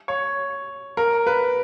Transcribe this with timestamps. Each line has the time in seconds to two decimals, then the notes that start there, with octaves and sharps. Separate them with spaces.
0.08 C#5
0.97 A#4
1.27 B4